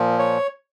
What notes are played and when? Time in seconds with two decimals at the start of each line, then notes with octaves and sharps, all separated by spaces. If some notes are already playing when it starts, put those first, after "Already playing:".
Already playing: A#2 F3
0.19 C#5